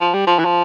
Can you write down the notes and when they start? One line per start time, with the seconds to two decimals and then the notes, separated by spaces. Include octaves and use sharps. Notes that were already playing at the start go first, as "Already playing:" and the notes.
0.01 F3
0.14 G3
0.27 F3
0.39 E3
0.45 F3